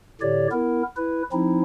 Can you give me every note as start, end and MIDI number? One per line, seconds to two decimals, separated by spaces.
0.21 0.48 45
0.21 0.48 50
0.21 0.48 67
0.21 0.48 73
0.21 0.48 74
0.51 0.83 59
0.51 0.83 64
0.51 0.83 70
0.97 1.23 64
0.97 1.23 71
1.32 1.63 53
1.32 1.63 60
1.32 1.63 63
1.32 1.63 64